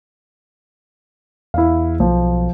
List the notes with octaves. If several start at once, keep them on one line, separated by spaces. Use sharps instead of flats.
E2 E4 F5
B1 F3